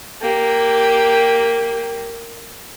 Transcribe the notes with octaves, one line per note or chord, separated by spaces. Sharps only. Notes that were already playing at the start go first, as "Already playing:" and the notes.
A#3 G4